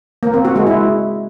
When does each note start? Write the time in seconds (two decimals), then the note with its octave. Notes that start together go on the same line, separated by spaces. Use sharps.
0.23 A#3
0.34 C4
0.45 F#4
0.56 G#3
0.67 E4